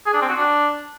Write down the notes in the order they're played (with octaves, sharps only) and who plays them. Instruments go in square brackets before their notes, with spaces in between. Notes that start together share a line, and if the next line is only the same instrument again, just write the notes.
[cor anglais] G#4
D4
C4
F#4
D4